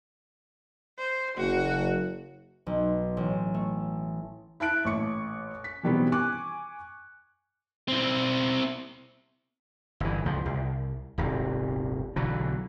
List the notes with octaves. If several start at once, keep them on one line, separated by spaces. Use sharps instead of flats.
C5
F#1 F#4
B1
A1
A3
E4 E5 A5 F#6 D7
A1 A#2 C#6 C#7
B6
B2 D#3 E3 G3 B3 C4
G#5 C#6 D6 F#6
C4 E4
G1 E3
C#2 F3
C2
D#1 G#1 C3
B1 D3 E3 F#3